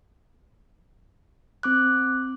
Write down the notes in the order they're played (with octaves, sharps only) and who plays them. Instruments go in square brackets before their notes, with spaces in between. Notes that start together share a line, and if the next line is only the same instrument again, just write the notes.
[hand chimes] C4 D6 F#6